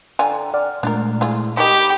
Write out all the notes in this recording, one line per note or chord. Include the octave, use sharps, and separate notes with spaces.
D3 F4 D5 G5 G#5 A#5
D5 F#5 F6
A#2 G#3 A3 D4 F4 A#4
E4 F4 G#4
D#4 G4 A#4 D#5 B5 C#6